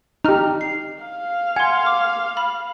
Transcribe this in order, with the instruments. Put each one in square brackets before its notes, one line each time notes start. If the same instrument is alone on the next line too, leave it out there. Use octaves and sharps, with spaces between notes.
[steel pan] D#4 G4 [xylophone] A#5 F6
[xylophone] C7
[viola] F5
[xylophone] F#5 C6 [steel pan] G#5
[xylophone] D6
B5